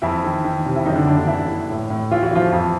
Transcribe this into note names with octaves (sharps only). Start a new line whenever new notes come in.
F2 E3 E4
D#3
D#3
C3
E4
F#2 D#3 D#4
D3 D4
F#2 D3 D4
D3 D4
E3 E4
E3
A2
A2
E3 F4
F#4
E3 F3 F4
F2